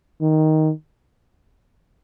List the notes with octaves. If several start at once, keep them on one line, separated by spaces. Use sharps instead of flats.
D#3